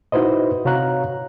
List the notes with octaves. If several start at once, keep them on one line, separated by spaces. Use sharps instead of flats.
D#4 E4 F#4 B4 C5 D#5
C3 F#4 C#5 F5 A#5 F#6